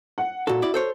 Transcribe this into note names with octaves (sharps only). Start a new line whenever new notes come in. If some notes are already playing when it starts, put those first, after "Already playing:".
F#5
A#2 F#4 A4
E4 D5
A4 C5 C#5